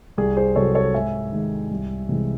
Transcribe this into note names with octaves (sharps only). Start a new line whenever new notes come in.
C2 G#4
G#4 C5
C3 F#3 A4 C#5
A4 C#5
G#2 E5 G#5
D#3 G#3
C2
C3 E3 G#3